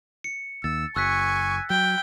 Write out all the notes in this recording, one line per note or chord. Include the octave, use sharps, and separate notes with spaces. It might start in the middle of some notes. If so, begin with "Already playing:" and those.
C#7
D#2 E6 A6
F#1 G#5 C#6 E6 F#6 B6
F#3 G5